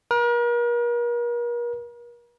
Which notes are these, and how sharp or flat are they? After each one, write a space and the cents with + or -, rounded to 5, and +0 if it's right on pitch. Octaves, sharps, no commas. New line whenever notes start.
A#4 +40